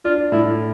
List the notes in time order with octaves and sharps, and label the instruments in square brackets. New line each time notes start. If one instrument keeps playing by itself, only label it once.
[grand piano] D4 [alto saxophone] F4
[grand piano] A2 [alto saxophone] E4